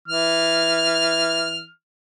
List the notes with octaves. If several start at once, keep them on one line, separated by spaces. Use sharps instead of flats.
E3 F6